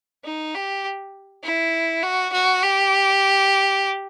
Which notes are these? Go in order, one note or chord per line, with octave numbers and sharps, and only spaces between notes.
D#4
G4
E4
F#4
F#4
G4